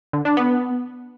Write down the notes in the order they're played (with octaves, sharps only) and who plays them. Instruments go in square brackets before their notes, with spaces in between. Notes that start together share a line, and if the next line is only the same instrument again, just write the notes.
[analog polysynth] D3
D4
B3